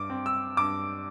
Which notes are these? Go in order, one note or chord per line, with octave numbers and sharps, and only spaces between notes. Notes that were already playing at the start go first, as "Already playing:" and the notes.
Already playing: G2 D6
C4
E6
G2 D6